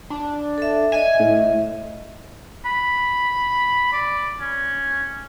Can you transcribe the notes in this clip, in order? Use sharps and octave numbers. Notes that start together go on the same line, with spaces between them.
D4
A4 E5
D#5 E5 G#5
A2
B5
D5
C#4